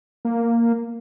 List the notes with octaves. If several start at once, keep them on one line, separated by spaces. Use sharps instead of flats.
A#3